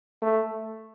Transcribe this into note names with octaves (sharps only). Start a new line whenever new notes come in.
A3